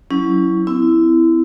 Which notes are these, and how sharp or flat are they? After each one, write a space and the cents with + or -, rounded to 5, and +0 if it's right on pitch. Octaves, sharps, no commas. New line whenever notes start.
F#3 +5 C#4 +10 E4 +0
C4 -40 E4 +0